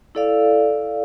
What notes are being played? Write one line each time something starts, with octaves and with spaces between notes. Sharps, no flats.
E4 A4 D5 F5